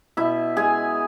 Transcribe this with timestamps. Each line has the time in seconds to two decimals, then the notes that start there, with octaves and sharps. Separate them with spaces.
0.17 B2 E4 E5
0.57 G#3 G#4 G#5